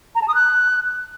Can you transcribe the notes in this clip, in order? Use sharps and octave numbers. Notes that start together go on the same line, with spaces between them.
A#5
A5
D#6
F#6